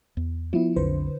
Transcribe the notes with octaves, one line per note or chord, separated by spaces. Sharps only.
E2
F3 A#3 B3 E4
B1 F2 D3 B4 C5